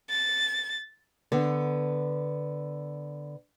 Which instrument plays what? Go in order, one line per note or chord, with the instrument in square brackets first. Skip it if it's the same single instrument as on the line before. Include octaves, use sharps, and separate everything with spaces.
[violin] A6
[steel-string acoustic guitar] D3 B3